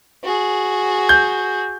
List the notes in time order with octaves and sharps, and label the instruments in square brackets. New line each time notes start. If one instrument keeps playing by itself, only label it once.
[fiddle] F#4 G#4
[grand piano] G6